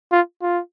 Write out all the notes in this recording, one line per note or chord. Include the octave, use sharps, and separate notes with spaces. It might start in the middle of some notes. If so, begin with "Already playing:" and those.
F4
F4